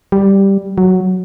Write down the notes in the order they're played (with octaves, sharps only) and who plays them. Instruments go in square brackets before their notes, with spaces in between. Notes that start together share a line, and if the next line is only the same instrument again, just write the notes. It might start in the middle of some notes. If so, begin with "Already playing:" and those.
[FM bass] G3
F#3